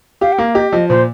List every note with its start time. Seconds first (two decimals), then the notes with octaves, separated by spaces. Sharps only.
0.21 G4 F5
0.33 G5
0.38 A#3 F5
0.55 G4 D#5
0.72 F3 D#5
0.89 A#2 C5